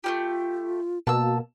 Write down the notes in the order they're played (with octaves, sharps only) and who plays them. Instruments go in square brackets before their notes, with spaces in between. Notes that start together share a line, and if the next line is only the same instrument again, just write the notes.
[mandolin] A3 C#4 G4 [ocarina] F4
[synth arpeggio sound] B2 A#3 [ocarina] F#4 [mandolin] A5 E6